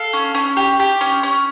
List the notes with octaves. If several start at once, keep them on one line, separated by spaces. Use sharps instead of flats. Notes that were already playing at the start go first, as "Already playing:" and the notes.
Already playing: A4 F5
C#4
C#4
G4
G4
C#4
C#4